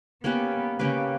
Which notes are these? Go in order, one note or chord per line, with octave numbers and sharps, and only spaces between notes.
A#3 B3 C#4 G4 B4
C#3 A#3 C#4 G4 B4